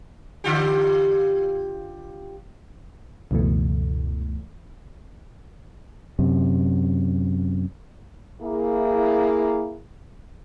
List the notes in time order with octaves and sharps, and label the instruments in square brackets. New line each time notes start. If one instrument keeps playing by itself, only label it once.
[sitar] D3 F4 G4
[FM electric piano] C#2 F#2 B2 E3 A3
[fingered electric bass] F#2 C3
[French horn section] A#3 E4 G#4